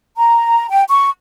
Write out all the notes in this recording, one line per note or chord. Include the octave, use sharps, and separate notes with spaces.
A#5
G5
C#6